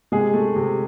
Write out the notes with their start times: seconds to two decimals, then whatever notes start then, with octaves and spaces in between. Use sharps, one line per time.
0.12 C3 G#3 G#4
0.34 A3
0.56 C3